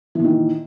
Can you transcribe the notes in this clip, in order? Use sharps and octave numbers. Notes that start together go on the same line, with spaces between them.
A#2 D#3 E3